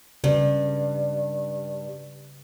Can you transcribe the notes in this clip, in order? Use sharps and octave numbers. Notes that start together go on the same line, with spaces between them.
G2 C#3